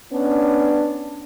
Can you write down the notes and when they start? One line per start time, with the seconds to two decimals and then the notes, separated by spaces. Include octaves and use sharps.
0.13 B3 C#4 D4